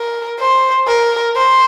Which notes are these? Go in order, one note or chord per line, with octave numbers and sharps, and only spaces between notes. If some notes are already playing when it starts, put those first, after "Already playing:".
Already playing: A#4
C5
A#4
C5